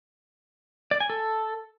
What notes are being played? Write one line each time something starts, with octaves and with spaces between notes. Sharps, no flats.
D5
G#5
A4